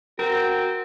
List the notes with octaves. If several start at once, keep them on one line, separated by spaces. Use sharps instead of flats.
C4 F#4 A#4